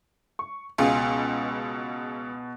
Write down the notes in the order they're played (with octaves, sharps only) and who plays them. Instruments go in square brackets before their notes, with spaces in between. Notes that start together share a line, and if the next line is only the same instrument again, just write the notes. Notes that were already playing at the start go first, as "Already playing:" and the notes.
[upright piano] C#6
[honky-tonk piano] C#2 [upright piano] B2 [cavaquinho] F4 G#4